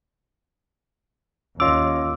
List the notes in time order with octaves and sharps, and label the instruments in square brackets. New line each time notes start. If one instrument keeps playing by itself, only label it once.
[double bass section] D#2 [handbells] C#4 C#5 D#5 [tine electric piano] F4 D6 [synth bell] E6